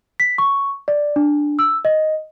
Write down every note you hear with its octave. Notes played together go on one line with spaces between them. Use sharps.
B6
C#6
D5
D4
E6
D#5